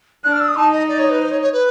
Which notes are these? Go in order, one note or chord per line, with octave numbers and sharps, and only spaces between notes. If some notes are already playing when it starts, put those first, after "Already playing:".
D4 F#6
F6
E6
D#6
D#4 A5
D#5
D5
C#5
B4
C5
C#5
C#5
B4